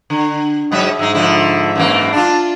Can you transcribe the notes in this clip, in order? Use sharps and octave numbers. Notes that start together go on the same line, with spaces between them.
D3
G#2 F#3 D#5 E5
G#2 G#3 D#4 E5
D3 F3 E4
F#2 E3 A#3
D4 F4 A5